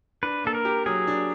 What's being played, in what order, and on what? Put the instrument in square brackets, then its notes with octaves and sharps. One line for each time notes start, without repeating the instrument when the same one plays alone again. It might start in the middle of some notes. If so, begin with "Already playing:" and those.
[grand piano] D4 [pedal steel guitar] B4
[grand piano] A#3 [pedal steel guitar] A4
[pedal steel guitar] A#4
[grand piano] G4
[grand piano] F#3 [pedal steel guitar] G#4
[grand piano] D4